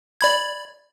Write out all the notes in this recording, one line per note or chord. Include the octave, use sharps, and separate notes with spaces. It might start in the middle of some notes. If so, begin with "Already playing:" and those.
D5 B5 G#6